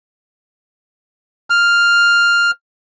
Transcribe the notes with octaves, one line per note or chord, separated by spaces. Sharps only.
F6